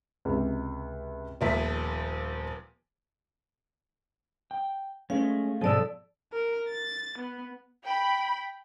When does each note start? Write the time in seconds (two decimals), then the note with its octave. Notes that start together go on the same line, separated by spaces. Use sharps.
0.25 C#2 C3
1.41 D#1 A#2 F3 B3 E5 B6
4.51 G5
5.10 G#3 A3 C#4 F5
5.61 G#2 B2 F3 G#3 A4 D5 A5 E6
6.33 A#4
6.69 A6
7.18 B3
7.84 G5 B5